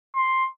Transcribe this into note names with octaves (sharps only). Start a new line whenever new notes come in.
C6